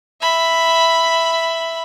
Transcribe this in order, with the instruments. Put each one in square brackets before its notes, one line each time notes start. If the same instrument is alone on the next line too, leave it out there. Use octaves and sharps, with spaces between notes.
[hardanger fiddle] E5 B5